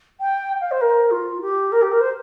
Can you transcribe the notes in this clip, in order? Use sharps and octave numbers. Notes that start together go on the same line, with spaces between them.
G5
F5
C5
A#4
F4
G4
A#4
G4
A#4
C5